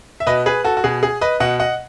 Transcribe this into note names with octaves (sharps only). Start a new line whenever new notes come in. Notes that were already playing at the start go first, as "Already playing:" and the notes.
E5
B2 B4 D#5
G#4 B4
F#4 A4
F#4
B2 G#4
G#4
B4 D#5
B2 D#5 F#5
D#5 F#5